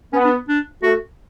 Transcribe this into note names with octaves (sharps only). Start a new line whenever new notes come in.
B3 C#4
D4
D4
A3 F#4